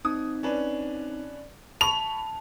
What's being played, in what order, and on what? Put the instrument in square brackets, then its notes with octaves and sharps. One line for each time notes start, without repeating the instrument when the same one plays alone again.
[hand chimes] C4 D#4 [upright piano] D#6
[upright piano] C#4 D4 B4
[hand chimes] A5 [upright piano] B5 C#6 [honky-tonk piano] F7